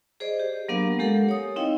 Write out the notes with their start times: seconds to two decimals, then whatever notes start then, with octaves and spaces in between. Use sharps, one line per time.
0.20 G#4 C5 D5 D#5
0.40 G4
0.69 F#3 A#3 B3 D4 A#4 F5
0.99 G#3 G4 A4 A#4 F5 F#5
1.29 C#5 D#6
1.56 C4 D#4 E4 D#5 F5 G5